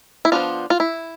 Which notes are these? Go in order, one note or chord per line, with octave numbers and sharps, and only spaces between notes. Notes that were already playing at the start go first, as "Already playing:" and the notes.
E4
F3 B3 D4 F4
F4
E4